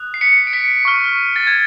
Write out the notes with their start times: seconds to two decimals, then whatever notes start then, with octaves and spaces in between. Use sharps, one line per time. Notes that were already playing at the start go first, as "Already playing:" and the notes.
Already playing: D#6 F#6
0.14 C7
0.21 B6 C#7
0.47 D7
0.53 B6 C#7
0.85 C#6 F6
1.36 A6
1.47 G#6